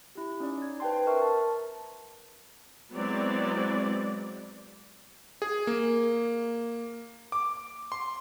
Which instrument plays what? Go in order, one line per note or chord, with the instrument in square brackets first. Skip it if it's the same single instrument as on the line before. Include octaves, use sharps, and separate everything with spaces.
[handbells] E4 G4
C#4 D#4 D5
G#6
B4 C5 D5 G5 A5 C6
A#4 E5 C#6 F6
A5
[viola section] F#3 G#3 B3 C4 E4 D5
[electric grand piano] G#4
A#3
D6
C6